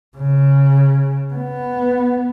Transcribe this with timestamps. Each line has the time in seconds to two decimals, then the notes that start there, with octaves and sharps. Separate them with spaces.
0.17 C#3
1.34 B3